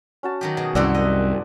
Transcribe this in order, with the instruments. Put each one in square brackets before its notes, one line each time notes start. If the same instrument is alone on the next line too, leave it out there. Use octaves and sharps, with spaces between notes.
[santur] C#4 F#4 A5
[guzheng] D#3 F#3 G4
[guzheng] B2 G#4 [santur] A5
[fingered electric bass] C2 [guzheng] F#2 C4 F#4 [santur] D5 E5 F#5
[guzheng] D#5